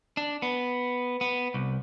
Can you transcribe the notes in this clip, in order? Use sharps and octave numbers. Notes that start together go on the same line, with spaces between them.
D4
B3
B3
C2